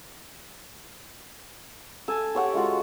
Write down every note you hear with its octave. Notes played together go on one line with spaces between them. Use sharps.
A4 G#5
G4 C#5 F#5 G5
G#3 F4 F#4